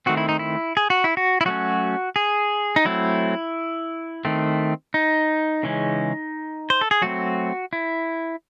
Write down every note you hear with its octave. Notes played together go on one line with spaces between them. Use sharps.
D#3 A3 C4 F#4
E4
D#4
E4
G#4
F#4
E4
F#4
E4
F#3 A3 C#4 F#4
G#4
D#4
F#3 A3 C4 E4
D#3 A3 C4
D#4
C#3 E3 G#3 C#4
C5
A4
G#4
F#3 A3 C4 F#4
E4